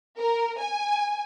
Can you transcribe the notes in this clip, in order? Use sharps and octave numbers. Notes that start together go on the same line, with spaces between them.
A#4
G#5